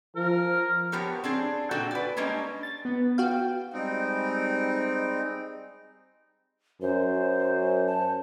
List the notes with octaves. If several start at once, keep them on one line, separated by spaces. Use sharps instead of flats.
F3 A#4
F3 B3 G4 A#4 C#5
C4 D4 G#4
A#2 F#4 A4 D5 G5
B4 D5
G3 G#3 A#3 C#4 D4
A6
B3
F#4 F5 G5
G3 G#3 C4 D#4
F#2 C5
A5